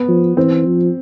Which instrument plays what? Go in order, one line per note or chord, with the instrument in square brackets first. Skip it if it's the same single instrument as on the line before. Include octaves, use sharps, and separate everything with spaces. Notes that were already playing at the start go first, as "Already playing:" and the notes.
Already playing: [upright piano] B3
[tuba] F3
[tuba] E3 [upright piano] C4
[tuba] F3